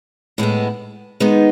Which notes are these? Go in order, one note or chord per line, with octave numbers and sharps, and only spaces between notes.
A2 G#3 B3 E4
D#3 G#3 B3 D#4